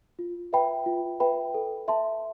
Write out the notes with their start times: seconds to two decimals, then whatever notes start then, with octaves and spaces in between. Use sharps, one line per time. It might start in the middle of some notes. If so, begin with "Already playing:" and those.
0.19 F4
0.53 B4 E5 G5 B5
0.86 F4
1.20 B4 E5 G5 B5
1.54 A4
1.88 E5 A5 C6